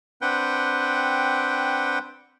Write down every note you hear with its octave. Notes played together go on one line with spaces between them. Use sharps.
C4 D4 B4 F#5 G5